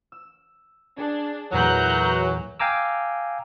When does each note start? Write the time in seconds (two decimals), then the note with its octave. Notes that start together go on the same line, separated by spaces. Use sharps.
0.12 E6
0.98 D4 G#4
1.52 E2 A#2 E3 F#3 A3 A#5 F#6 G6
2.59 F5 G5 G#5 A#5 D6 E6